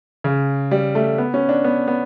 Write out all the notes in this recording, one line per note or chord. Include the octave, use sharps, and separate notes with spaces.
C#3
G3
A3
B3
C#4
D4
B3
B3